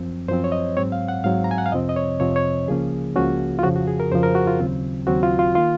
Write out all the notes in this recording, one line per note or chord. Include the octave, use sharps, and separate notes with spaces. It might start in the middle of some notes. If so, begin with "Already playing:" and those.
Already playing: F#2 F3 C4
F#2 F3 C4 C5
C#5
D#5
G#2 F#3 C4 C#5
F5
F#5
G#2 F#3 C4 F5
A#5
G#5
F#5
F5
F2 C3 F3 C4 D#5
D#5
C#5
F2 C3 F3 C4 C#5
C#5
C#2 C#3 F3 A#3 C#4 G#4
C#2 C#3 F3 A#3 C#4 F#4
F4
F2 C#3 F3 F#4
F#4
G#4
A#4
F2 C#3 F3 C5
A#4
F#4
F4
D#2 C#3 F#3 C4
D#2 C#3 F#3 C4 F#4
F4
F4
D#3 A#3 F4